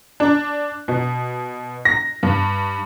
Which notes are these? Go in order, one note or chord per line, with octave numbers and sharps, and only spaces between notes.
D4
B2
A#6
G2